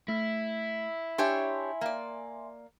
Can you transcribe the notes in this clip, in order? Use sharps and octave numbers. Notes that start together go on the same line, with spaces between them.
A3 E4
D4 G4 C#5 E5 G#5 C6
A#3 D5